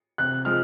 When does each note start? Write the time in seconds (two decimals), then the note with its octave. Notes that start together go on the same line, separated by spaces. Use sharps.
0.18 C3 F#6
0.45 F3 G#3 F6